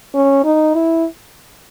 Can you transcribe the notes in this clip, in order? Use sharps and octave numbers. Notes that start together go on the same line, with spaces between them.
C#4
D#4
E4